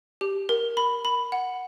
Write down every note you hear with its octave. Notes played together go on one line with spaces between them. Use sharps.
G4
A#4
B5
B5
F#5